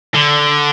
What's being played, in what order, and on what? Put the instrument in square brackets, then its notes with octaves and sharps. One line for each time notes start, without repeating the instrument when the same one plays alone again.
[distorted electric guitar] D3